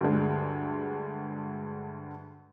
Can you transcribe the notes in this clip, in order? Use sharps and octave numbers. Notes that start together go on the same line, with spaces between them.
D2 G2 D3 G#3